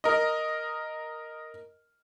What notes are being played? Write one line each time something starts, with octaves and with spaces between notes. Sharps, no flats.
A#4 D#5